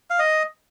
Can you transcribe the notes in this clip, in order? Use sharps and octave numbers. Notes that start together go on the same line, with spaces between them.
F5
D#5